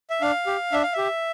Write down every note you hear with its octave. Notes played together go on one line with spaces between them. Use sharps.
E5
D4 F5
G4
D4 E5
F5
G4 E5